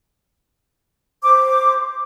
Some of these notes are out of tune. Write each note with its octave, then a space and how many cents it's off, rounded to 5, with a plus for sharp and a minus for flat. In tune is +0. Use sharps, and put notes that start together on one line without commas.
C5 +0 D6 +0